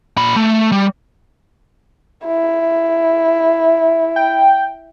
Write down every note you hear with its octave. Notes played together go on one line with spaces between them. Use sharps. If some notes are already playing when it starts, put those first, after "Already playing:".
A#2 B5
A3
G3
E4
G5